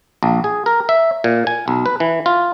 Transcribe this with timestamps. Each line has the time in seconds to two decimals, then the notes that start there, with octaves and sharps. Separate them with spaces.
0.23 A#1
0.44 G#4
0.66 A#4
0.89 E5
1.24 A#2
1.47 G#5
1.68 B1
1.86 B4
2.00 E3
2.26 F4